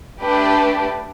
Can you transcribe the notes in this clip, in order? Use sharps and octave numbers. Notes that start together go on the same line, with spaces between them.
A3 D4 G4 B4